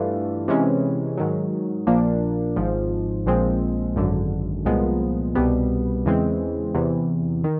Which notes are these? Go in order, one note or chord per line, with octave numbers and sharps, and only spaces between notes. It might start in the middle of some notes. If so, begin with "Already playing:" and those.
Already playing: G2 E3 A3 D4 F4
C3 E3 G#3 C#4
G#2 D#3 F#3
A#1 A#2 F3 A#3 D4
G#1 G#2 F3
A#1 A#2 F3 G#3 C4
G#1 F#2 D3
C2 A#2 F3 G#3 B3
C2 B2 G3 B3
E2 C#3 E3 G#3 C4
E2 C3 E3
D#3